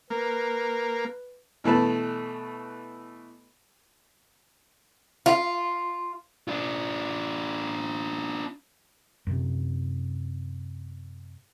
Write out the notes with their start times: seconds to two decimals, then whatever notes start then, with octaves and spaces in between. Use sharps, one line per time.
0.10 A#3 B4
1.64 B2 E3 A3 B4 A5
5.26 F4
6.48 D4 F4
9.27 F#2 C3